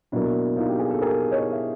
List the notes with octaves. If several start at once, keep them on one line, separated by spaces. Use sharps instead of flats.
B2 F#3 A#3 D4 E4
D#4 F4
G4
G#4
A4
G#4 A#4
C#5 D#5
E5